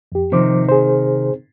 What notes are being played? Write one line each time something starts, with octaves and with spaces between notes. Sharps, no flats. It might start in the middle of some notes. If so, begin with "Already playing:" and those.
F2 G4
C3 D#3 F3 C5 D6
G#4 C5